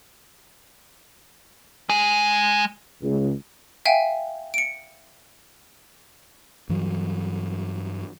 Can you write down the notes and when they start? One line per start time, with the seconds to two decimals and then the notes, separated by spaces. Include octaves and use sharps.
1.89 G#3 G#5
3.02 C#2
3.85 E5 F5 G5 G#5
4.54 C#7 D7
6.69 G2 E3 F#3